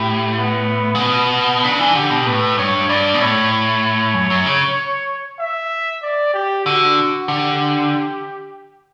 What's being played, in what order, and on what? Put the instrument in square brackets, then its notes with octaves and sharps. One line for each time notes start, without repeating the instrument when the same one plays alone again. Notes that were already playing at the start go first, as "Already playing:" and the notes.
Already playing: [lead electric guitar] A2 [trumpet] G4
[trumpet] B3
[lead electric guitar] C#3
[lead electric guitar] B2 [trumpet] B3
[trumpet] B3
[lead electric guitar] C#3 [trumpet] D4
[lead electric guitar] E3
[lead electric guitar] D3 [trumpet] G4
[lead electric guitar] B2
[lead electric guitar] A2 [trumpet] B4
[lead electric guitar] G2 [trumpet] C#5
[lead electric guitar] G2 [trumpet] D5
[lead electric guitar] B2
[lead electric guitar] A2 [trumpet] C#5
[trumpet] C#5
[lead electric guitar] F#2
F#2
C#3
[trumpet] E5
D5
G4
[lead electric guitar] D3 [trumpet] F#4
[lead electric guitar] D3 [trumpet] G4